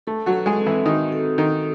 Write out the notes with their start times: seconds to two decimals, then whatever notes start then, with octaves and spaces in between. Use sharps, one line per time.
0.07 A3 A4
0.26 F#3 F#4
0.33 A4
0.46 G#3 G#4
0.60 C4
0.66 E3 E4
0.86 D#3 D#4 F#4
1.12 A4
1.38 D#3 D#4 A4